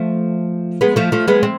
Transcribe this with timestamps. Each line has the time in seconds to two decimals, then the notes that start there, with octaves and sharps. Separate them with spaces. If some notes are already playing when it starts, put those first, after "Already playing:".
Already playing: F3 A3
0.81 G#3 B3
0.96 F3 A3
1.12 F3 A3
1.28 G#3 B3
1.43 C4